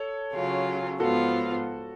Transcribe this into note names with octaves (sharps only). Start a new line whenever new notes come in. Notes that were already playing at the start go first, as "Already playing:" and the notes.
Already playing: A4 C#5
C#3 F#3 C#4 F4
G#2 F3 B3 F4 F#4 A4